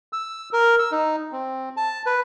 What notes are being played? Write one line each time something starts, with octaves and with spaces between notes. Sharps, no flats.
E6
A#4
E6
D#4
C4
A5
B4